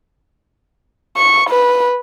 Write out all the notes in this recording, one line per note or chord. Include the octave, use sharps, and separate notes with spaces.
C#6
B4